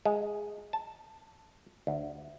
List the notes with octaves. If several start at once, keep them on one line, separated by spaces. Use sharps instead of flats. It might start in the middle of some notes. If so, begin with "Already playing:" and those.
G#3
A5
D2